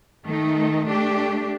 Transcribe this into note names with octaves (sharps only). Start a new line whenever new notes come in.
D#3 A3 D#4
A3 D4 G4